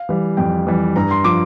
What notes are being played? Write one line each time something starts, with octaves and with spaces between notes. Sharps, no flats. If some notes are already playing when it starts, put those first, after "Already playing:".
Already playing: F5
E3 G3
F2 G5
E3 G3
G2 A#5
C6
F3 D6